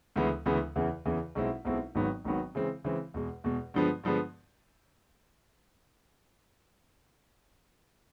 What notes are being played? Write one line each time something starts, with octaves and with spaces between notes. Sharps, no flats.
D2 C#3 E3 G#3 B3
D2 C#3 E3 G#3 B3
E2 C#3 E3
E2 C#3 E3
B1 B2 G#3 C4 E4
B1 B2 G#3 C4 E4
G#1 G#2 D#3 F#3 B3
G#1 G#2 D#3 F#3 B3
C#3 E3 G#3 C4
C#3 E3 G#3 C4
E2 B2 G#3
E2 B2 G#3
G2 D3 F3 G#3 B3
G2 D3 F3 G#3 B3